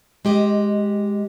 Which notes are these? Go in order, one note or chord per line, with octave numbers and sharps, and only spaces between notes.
G#3 G4 D#5